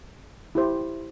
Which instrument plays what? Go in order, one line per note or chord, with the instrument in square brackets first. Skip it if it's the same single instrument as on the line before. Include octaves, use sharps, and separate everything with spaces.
[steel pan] E4 G4 C5